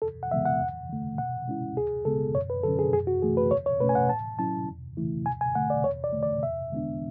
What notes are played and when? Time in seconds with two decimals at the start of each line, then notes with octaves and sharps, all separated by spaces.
0.02 E2 A4
0.23 F#5
0.31 C#3 E3 G#3 B3 E5
0.46 F#5
0.60 E2
0.90 D3 A3
1.18 B2 F#5
1.48 G#3 C#4 E4
1.76 D2 G#4
2.05 C#3 G#3 B3 A4
2.35 F#2 C#5
2.50 B4
2.63 D3 F#3 C#4 A4
2.79 G#4
2.93 F#2 G#4
3.07 F#4
3.22 E3 A3 G#4
3.37 B4
3.51 E2 C#5
3.66 C#5
3.80 B2 A3 C#4 B4
3.89 G#5
3.95 F#5
4.09 A2 A5
4.39 F#3 C#4 E4 A5
4.68 E2
4.97 C#3 E3 A3 E4
5.26 D2 G#5
5.41 G#5
5.55 D3 A3 F#5
5.70 D5
5.84 E2 C#5
6.04 D5
6.13 D3 A3
6.23 D5
6.43 E2 E5
6.72 D3 G#3 B3 D4